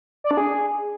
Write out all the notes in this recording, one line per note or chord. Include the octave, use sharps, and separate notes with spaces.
D5
D4
G#4